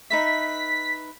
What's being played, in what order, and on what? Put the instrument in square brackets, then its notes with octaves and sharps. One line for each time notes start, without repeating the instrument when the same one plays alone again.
[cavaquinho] D#4 B4 E5 [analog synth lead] B6